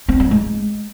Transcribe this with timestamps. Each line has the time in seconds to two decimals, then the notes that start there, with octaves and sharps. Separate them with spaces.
0.08 C4
0.20 F#3
0.31 G#3